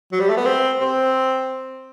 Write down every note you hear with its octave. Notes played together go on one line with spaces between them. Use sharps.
F#3
G3
A3
B3
C4
C4